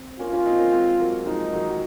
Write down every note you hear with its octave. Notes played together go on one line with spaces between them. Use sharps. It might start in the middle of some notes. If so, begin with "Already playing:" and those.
Already playing: C4
A#3 C#4 F4
A#3 C#4
C4 D#4
A#3 C#4
G#3 C4
F#3 A#3
F3 G#3 D#4
D#3 F#3
F#3